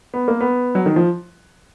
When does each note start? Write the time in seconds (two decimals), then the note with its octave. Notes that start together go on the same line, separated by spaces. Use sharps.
0.14 B3
0.28 A#3
0.41 B3
0.75 F#3
0.86 D#3
0.96 F3